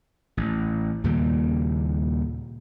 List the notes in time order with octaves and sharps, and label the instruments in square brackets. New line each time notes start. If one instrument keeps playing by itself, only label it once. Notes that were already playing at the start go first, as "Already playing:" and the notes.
[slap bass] A1
D#2 A#2 C#3 G3